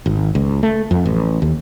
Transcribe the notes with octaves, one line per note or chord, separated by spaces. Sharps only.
G#1
C#2
A3
F2
A1
D#2